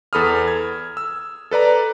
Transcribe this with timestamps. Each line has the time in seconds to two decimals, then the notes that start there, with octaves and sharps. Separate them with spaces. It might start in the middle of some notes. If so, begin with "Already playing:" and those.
0.13 E2 A4 B5 D#6 F6
0.48 G#6
0.97 E6
1.51 A4 B4 D5 A#5